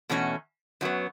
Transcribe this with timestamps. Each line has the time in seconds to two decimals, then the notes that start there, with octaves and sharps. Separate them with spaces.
0.09 E2 B2 A3 C#4 F#4
0.81 F#2 F#3 B3